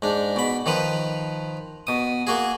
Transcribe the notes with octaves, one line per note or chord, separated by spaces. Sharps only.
G#2 D4
B2 B5
D#3 F3 B4
B2 D#6
A#3 F#4 G#4